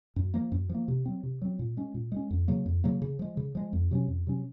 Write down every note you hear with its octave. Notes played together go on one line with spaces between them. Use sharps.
F#2
F3 A#3
F#2
F3 A#3
C3
F#3 C4
C3
F#3 C4
A#2
G#3 C#4
A#2
G#3 C#4
F2
C#3 F#3 A#3
F2
C#3 F#3 A#3
C#3
F3 G#3
C#3
F3 G#3
F2
C3 F#3 C#4
F2
C3 F#3 C#4